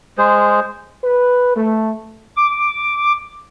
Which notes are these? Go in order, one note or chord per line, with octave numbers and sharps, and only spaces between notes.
G#3 G#4 C5
B4
A3
D6